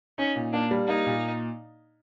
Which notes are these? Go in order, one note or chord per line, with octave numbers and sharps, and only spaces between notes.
C#4 D#4
A#2
A#3 D4
G3
A#3 D#4
A#2